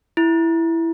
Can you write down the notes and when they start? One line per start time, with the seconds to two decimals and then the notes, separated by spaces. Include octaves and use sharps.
0.17 E4